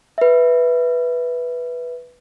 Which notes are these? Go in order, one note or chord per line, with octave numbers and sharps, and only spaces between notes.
B4 E5